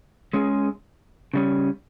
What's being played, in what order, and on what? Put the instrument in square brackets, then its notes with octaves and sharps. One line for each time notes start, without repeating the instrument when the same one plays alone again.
[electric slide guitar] G#3 C#4 G#4
C#3 G3 C#4